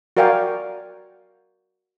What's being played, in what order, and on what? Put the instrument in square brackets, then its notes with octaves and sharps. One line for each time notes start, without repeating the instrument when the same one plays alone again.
[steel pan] F#4 A#4 D5 F5 G5 G#5